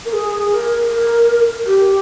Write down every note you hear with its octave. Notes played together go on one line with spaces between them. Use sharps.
A#4
G#4
A#4
A#4
G4